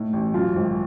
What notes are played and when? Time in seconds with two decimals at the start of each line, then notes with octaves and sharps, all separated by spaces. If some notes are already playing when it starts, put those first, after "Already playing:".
Already playing: A2 D#4
0.13 A1
0.34 F#2 F4
0.56 G#1